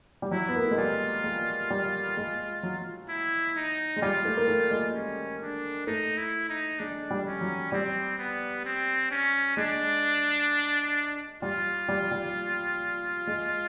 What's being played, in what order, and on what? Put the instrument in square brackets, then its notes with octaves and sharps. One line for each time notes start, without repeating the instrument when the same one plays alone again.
[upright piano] G3
[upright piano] F#3 [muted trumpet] E4
[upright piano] B3
A#3
A3
G#3
[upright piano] G3 [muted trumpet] F4
[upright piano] G#3
G3
G#3
F#3
[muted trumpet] E4
D#4
[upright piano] G#3
[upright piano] G3 [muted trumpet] F4
[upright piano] A3
A#3
A3
G#3
[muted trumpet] C#4
D4
[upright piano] A3 [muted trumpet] D#4
[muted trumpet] E4
D#4
[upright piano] G#3 [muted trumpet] D4
[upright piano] G3
[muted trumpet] C#4
[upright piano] F#3
[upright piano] G3 [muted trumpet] C4
[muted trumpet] B3
C4
C#4
[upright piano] G#3 [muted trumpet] D4
[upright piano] G3 [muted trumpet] F4
[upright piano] G3
G3
G#3